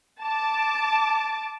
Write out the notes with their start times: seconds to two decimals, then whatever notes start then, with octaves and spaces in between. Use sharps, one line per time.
0.21 A5 D6